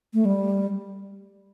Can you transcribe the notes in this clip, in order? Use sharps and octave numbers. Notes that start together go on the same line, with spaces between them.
A3
G3